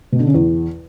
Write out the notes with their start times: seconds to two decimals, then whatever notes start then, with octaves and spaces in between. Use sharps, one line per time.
0.12 B2
0.20 D3
0.27 C#3
0.34 E2